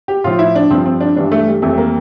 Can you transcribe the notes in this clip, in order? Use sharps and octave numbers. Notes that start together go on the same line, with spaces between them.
G4
A2 F3 F4
E4
D4
G2 F3 C4
C4
D4
G2 E3 G3 D4
A3
G3
F2 E3 G3 A3
A3
A#3